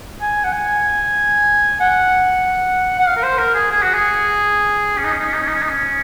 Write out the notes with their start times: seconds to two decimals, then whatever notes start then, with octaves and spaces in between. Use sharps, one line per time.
0.21 G#5
0.44 F#5
0.53 G#5
1.80 F#5
2.99 F#5
3.07 F5
3.17 A#4
3.23 C5
3.38 A#4
3.54 G#4
3.71 G#4
3.83 F#4
3.94 G#4
4.98 C#4
5.04 D#4
5.12 C#4
5.19 D#4
5.25 C#4
5.33 D#4
5.40 C#4
5.48 D#4
5.54 C#4
5.62 D#4
5.69 C#4